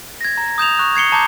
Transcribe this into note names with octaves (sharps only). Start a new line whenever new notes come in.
G#6 A#6
A#5
D#6 G6 E7 F7
C#6 F#6
G#6 C7 C#7 G7
A5 A#5 D6 G6 G#6